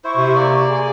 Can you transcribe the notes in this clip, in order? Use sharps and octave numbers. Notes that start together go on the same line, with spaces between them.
E4 C5 C#6
C3
A#3 D5
G#4